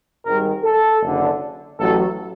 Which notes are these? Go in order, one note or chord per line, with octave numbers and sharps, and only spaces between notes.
G#1 G#2 D#3 G3 A#4
A4
F#1 F#2 D3
A1 A2 F#3 A4